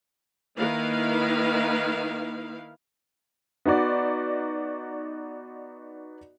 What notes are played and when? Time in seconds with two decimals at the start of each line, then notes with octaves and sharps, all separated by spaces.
0.58 D#3 A#3 E4 B4 F5
3.66 B3 D#4 F#4 D5